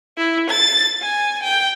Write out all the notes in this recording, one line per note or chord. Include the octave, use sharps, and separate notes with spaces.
E4
A6
G#5
G5